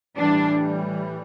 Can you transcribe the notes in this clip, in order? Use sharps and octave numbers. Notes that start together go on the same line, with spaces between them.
A2 E3 G3 D4